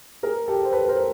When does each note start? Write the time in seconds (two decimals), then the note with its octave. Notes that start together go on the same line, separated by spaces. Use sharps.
0.23 G#4 A#4
0.48 G4 A4
0.65 C5
0.72 A4 B4
0.88 A#4 C5